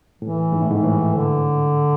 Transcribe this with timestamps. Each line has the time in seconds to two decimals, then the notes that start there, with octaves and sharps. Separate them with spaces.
0.21 A2 E3
0.52 G#2
0.62 A2
0.68 G#2 E3
0.84 A2
1.14 D3